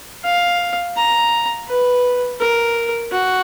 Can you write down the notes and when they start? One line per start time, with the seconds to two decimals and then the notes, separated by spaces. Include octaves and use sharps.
0.25 F5
0.97 A#5
1.69 B4
2.40 A#4
3.12 F#4